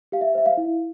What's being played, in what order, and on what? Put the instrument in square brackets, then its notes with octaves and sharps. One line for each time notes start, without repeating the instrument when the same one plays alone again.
[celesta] G4 F5
E5
C5 E5
F5
E4